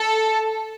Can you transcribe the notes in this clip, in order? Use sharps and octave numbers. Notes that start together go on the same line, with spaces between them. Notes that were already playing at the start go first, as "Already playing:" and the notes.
Already playing: A4